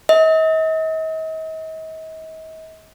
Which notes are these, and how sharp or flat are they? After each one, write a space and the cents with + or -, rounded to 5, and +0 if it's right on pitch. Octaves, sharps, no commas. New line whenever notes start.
D#5 +45